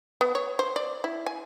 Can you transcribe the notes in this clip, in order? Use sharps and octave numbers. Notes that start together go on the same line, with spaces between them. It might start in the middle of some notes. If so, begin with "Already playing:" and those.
B3
C#5
C5
D5
E4
G#5